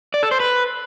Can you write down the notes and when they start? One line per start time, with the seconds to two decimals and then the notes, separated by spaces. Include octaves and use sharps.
0.14 D5
0.23 A4
0.31 C5
0.40 B4